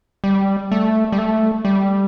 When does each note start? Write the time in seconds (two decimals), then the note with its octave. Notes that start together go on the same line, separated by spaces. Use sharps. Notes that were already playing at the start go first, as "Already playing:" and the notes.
0.24 G3
0.72 A3
1.12 G3
1.18 A3
1.65 G3